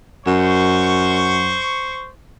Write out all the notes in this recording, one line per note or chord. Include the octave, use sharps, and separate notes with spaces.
F#2 C5 C#6